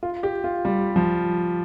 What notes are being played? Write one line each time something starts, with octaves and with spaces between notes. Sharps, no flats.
F4
G4
F4
G3
F3